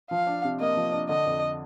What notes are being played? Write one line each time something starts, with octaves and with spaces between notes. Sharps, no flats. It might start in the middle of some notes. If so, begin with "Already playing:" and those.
F3 F5
D4
C3
A#3 D#5
F3
D4
D3 D#5
F2